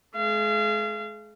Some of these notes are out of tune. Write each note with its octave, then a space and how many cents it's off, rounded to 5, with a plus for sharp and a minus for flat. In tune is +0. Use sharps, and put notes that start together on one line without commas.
G#3 +35 F5 -35